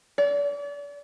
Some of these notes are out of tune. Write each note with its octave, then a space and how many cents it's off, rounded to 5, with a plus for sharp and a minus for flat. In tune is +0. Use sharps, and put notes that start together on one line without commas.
D5 -40